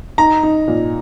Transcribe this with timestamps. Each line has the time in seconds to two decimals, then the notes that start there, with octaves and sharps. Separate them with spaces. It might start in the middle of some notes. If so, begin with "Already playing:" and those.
0.18 D#4 A#5
0.43 D#4
0.68 A#2